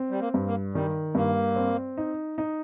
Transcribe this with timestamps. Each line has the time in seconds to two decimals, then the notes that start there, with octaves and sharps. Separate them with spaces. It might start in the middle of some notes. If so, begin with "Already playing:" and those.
Already playing: C4
0.10 G3
0.21 A#3
0.34 G2
0.47 A#3
0.74 D#3 G3
1.15 G2 A#3
1.56 C4
1.97 D#4
2.38 D#4